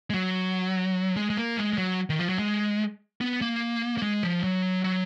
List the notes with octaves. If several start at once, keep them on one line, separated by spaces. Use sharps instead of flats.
G#3
F#3
G#3
G#3
A#3
G#3
G#3
F#3
D#3
F3
F#3
G#3
B3
A#3
A#3
G#3
F3
F#3
F#3